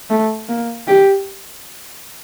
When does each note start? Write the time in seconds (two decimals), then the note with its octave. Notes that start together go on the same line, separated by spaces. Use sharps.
0.10 A3
0.49 A#3
0.88 G4